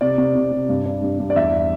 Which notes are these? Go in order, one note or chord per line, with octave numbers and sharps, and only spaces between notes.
C3 D5
C3
C3
C3
G2
D4
G2
G2
D5
E2 E5